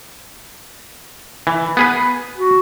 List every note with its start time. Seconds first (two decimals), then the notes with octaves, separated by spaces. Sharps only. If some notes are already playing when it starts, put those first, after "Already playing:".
1.47 E3
1.77 B3 G#4 B4
2.37 F#4